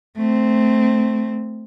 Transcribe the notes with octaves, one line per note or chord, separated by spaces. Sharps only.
A3 C4